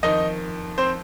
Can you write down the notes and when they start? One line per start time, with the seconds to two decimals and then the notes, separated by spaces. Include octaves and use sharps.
0.03 F2 D#3 D#4 D#5
0.78 C4 C5